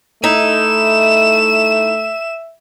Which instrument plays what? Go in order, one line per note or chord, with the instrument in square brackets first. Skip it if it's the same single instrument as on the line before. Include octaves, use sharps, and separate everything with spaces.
[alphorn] A3 [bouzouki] D#4 E4 [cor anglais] E5 [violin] E7